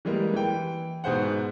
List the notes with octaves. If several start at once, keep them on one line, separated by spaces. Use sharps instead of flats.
E3 G3 G#3 A#3
E3 G5
G#2 B2 G#4 C5 F#5